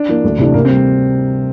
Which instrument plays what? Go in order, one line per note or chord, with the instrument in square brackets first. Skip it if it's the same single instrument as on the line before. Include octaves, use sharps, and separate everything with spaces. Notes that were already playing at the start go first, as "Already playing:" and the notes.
Already playing: [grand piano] D4
[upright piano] E3 A#3
D2
C3 E3 A3 D4
[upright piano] C3 [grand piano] A#3
[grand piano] C4
[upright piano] G3